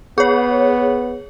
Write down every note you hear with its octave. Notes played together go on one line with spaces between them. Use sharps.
B3 G#4 C#5